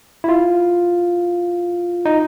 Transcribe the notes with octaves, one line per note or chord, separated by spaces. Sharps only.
E4
F4
D#4